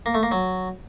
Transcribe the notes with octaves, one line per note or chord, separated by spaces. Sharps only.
A#3
A3
A#3
F#3